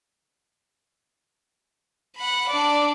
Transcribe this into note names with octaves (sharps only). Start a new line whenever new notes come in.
F#5 B5
D4 D5